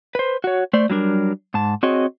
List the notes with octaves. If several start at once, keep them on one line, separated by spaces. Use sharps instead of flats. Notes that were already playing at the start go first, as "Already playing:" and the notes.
B4 C5
F#4 C#5
A3 C5 D5
F#3 G3 D4 A#4
G#2 A5
C4 F#4 G#4 C#5 D#5